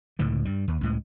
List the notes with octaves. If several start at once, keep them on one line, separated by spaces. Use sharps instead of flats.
C#2 A2 D3 D#3
G2 G3
D#2
C#2 A2 G#3